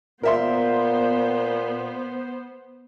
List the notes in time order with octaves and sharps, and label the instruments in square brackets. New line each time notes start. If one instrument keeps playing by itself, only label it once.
[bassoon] A#2 [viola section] B3 C5 [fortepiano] A#4 E5 C6